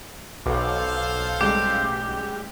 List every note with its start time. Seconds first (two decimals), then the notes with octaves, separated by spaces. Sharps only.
0.46 B1 A4 C5 F5 F#5 D6
1.41 A1 G3 G#3 G4